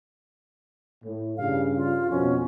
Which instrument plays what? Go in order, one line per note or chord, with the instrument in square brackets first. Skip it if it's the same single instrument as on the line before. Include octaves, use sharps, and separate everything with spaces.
[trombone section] A2
[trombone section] G2 C#3 [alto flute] F5
[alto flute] F4
[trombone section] F2 B2 [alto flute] C#4